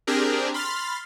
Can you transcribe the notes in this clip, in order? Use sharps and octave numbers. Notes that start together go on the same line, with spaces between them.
C4 D4 G4 G#4 A#4
B5 C6 F6 A6